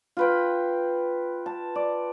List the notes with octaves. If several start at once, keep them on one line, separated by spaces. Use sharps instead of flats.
F4 B4 G5
A5
D5